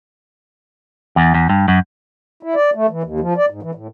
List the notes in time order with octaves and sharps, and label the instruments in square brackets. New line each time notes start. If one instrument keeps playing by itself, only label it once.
[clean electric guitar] E2
E2
G2
F#2
[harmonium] E4
D5
A3
E3
D#2
F3
D5
G#2
E3
A2